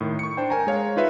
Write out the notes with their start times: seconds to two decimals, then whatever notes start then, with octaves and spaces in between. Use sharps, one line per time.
0.01 A2 D#3
0.19 C#6 C#7
0.37 D4 C5 G5
0.50 A#4 G#5 A#5
0.67 G#3 C#5 F5
0.96 D#4 F4 B4 E5 B5